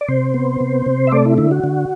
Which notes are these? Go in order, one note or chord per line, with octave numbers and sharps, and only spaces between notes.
D5
C3 C5
B3
C3
C3
E5
A3 D5
E4
D3 E4
F#4
D3